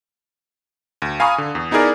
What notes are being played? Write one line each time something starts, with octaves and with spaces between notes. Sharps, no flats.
D2
F5 G#5 A#5 B5 C#6 D#6
D3
E2
B3 D#4 E4 G#4 A#4 D5